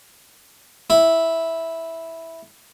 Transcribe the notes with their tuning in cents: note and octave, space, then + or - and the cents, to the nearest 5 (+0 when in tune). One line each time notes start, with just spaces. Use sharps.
E4 -5